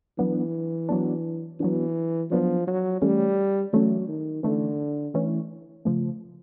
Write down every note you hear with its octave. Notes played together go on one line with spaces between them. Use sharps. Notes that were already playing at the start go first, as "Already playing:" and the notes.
E3 F#3 B3 D4
F#3 B3 D4
E3 F#3 B3 D4
F3 F#3 B3 D4
F#3
E3 G3 A3 C#4
E3 F#3 A3 C#4
D#3
D3 E3 A3 C#4
E3 A3 C#4
C#3 F3 A3